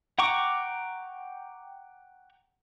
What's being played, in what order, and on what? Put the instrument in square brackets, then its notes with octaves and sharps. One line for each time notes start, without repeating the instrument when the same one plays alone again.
[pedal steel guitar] F#5 G5 A#5 C#6 D6